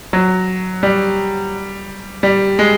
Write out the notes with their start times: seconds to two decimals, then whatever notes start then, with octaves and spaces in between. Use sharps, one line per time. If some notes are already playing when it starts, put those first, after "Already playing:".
0.13 F#3
0.83 G3
2.23 G3
2.59 G#3